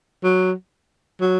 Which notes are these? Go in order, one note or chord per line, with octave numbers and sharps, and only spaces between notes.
F#3
F#3